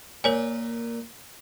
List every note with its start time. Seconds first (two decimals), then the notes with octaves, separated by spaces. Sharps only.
0.24 A#2 A#4 C#5 G#5